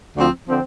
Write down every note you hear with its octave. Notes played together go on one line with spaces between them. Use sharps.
D2 D3 F3 C4
D3 F3 C4